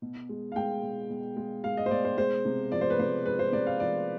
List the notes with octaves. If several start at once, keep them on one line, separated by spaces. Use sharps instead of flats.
B2
G#3
F5
G#3 G5
B2
B2
G#3
G#3 F5
D#5
C5
B2 D5
C5
G#3 C5
C3
F3 D5
C5
B4
C3 C5
G#3 B4
C5
C3 D5
F5
F3 D5